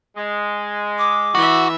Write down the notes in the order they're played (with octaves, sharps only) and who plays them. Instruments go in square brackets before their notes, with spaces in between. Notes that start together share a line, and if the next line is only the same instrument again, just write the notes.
[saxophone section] G#3
[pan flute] D6
[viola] E3 E5 [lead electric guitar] F#4